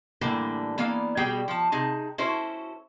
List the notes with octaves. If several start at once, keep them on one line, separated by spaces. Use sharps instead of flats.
A2 D3 E3 G3 A#3 A4
E3 A#3 B3 D5 F5
B2 G3 B3 G4 G#4 G5
F3 A5
C3 D#4 G#4 A5
C#4 E4 F#4 A4 C5